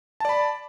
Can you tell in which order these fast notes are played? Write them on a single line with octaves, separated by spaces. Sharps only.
A5 D5 B5